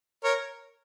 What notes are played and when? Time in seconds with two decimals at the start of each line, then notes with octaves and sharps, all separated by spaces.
0.24 A#4 C#5